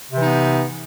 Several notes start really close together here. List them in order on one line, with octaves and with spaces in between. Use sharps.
C3 E3 D#4 B3